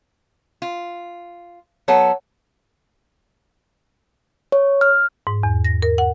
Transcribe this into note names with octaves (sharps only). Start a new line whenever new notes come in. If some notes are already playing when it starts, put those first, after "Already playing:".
F4
F#3 B3 A4 C#5 F#5
C#5
F6
G#2
E2
A#6
A#4
F#5